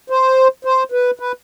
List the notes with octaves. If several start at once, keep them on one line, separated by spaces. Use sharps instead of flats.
C5
C5
B4
B4